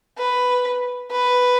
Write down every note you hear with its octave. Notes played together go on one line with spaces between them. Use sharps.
B4
B4